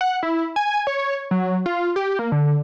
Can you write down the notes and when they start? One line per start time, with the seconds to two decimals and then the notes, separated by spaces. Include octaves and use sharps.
0.01 F#5
0.23 E4
0.56 G#5
0.87 C#5
1.31 F#3
1.66 F4
1.96 G4
2.19 A#3
2.32 D3